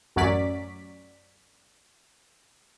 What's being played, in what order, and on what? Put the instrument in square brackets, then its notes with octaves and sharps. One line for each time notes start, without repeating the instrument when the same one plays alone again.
[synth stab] A1 F#2 F#3 C#4 D5 B6